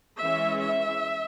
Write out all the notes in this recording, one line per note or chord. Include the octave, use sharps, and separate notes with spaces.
E3 G#3 C#4 E5
E5